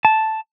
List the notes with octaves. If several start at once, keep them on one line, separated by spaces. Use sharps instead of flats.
A5